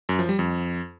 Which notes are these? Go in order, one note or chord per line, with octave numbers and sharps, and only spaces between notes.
F#2
F3
G3
F2